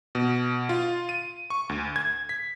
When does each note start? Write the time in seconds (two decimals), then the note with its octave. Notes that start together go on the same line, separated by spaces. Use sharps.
0.15 B2
0.69 F4
1.09 D#7
1.50 C#6
1.69 D2
1.96 G#6
2.29 B6